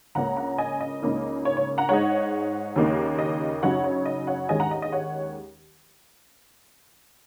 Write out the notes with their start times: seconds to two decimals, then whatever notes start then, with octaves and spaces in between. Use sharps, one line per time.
0.15 C#2 C#3 A#3 C#4 F#5 A#5
0.37 F#5 A#5
0.58 D#5 G#5
0.81 D#5
1.02 C#2 C#3 A#3 D#4
1.45 C#5
1.57 C#5
1.78 F#5 A#5
1.89 G#2 G#3 D#4 C#5 F#5
2.76 D#2 C#3 A#3 D#4
3.19 D#5
3.63 F#2 C#3 F#3 D#4 C#5 F#5
3.84 C#5
4.06 D#5
4.27 C#5 F#5
4.49 D#2 D#3 G#3 C#4 D#5 G#5
4.60 F#5 A#5
4.71 D#5
4.82 D#5
4.92 C#5 F#5